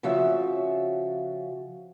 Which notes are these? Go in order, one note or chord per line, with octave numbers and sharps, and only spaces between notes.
C#3 F3 F#4 E5